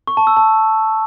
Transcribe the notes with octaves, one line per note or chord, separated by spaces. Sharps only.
C#6
A5
E6
A5